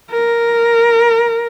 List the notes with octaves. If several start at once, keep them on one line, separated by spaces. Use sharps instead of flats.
A#4